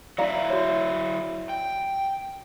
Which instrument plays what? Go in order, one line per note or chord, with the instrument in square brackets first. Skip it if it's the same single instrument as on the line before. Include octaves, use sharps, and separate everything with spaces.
[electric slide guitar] F#3 E4 E5 [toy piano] D5 F5 A#5
[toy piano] F#4 C#5
[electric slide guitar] G5